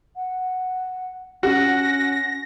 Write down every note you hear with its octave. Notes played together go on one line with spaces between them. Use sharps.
F#5
C#4 F#4 A#6